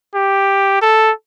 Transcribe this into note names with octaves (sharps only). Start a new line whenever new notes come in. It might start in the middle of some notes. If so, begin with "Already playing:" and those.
G4
A4